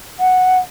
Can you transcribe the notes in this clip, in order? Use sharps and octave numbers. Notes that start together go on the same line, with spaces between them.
F#5